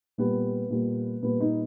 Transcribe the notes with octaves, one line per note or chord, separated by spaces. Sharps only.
A#2 G3 B3
A#2 G3
A#2 G3 B3
D#4